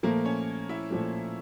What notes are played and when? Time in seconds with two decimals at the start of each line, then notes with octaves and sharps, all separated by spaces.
0.03 A#2 F3 A3 A#3 A#4
0.25 C#4 C#5
0.69 E4 E5
0.90 A#2 F3 A3